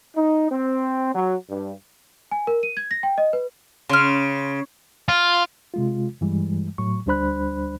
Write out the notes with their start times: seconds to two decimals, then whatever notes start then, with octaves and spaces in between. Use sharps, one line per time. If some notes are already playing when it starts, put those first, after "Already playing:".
0.16 D#4
0.51 C4
1.13 F#3
1.50 G2
2.31 G#5
2.47 A#4
2.63 D#7
2.77 G#6
2.91 A#6
3.03 G5
3.18 D#5
3.33 B4
3.89 C#3 C6 F6
5.09 F4
5.74 C3 G#3 F4
6.21 G2 E3 G3 G#3
6.78 A2 F#3 C#6
7.06 D2 G3 D4 C5 B5 F#6